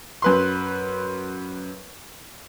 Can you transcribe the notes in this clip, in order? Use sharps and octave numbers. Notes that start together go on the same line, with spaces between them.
F#2 B4 C6